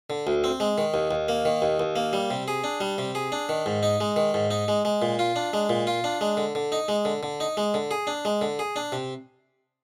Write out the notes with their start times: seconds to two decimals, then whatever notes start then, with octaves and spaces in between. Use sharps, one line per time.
0.10 D3
0.27 D2
0.44 C4
0.60 G#3
0.78 D#3
0.94 D#2
1.11 D#2
1.28 A#3
1.45 D#3
1.62 D#2
1.80 D#2
1.96 A#3
2.13 G3
2.30 C3
2.48 G#4
2.64 D4
2.81 G3
2.98 C3
3.15 G#4
3.32 D4
3.49 D#3
3.66 G#2
3.83 D#4
4.01 G#3
4.16 D#3
4.34 G#2
4.51 D#4
4.68 G#3
4.85 G#3
5.02 A#2
5.19 F4
5.36 D4
5.53 G#3
5.69 A#2
5.87 F4
6.04 D4
6.21 G#3
6.37 D3
6.55 D3
6.72 D#4
6.88 G#3
7.05 D3
7.23 D3
7.40 D#4
7.57 G#3
7.74 D3
7.91 G#4
8.07 D4
8.25 G#3
8.41 D3
8.59 G#4
8.76 D4
8.92 C3